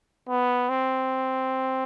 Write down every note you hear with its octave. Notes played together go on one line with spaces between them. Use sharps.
B3
C4